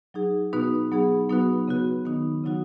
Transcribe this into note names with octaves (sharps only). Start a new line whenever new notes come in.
F#3 D#4 G#4
B2 B3 D#4 F#4 B4
F#3 B3 D#4 G#4
F#3 B3 D#4 F#4 B4
C#3 B3 F#4 B4
D#3 B3 D#4
C#3 F#3 D#4 F#4